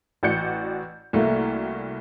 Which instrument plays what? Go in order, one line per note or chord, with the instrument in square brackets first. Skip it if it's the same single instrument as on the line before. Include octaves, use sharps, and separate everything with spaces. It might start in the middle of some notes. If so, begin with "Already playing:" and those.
[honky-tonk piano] A1 F#4 D5 G6 C#7
C2 A3 A#3 F#4